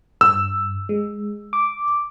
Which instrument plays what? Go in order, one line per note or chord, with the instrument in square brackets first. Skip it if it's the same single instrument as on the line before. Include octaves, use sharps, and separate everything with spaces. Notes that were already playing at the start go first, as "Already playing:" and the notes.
[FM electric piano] G2 [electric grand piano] E6
[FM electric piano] G#3
D6